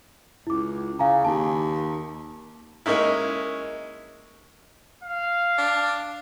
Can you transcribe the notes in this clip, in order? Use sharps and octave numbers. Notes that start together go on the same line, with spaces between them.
C#2 E4 D6
C#3 F5 G#5 A#5
D#2 A5
G#3 A#3 C#4 D#4 E4
F5
D4